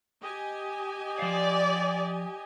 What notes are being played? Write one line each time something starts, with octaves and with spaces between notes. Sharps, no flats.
G4 D#5 G#5
F3 D5 F5